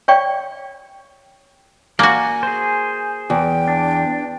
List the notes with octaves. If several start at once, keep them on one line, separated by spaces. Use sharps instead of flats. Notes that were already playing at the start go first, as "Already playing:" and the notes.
C#5 D5 F5 G5 C#6
A#3 F#4 D5 G#5
G#4 C5
E2 G5
D4